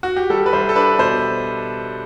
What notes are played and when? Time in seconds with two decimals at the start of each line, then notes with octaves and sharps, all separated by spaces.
0.03 F#4
0.16 G4
0.30 G3 A4
0.46 B4
0.53 C2 C5
0.69 A4
0.76 D4 B4
0.99 B2 C5